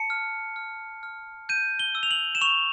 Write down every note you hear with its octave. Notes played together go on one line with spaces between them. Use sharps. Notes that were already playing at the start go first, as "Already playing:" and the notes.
Already playing: A5 C#7
F6
F6
F6
G6 D#7
G7
E6
F7
F#7
E7
C#6 F7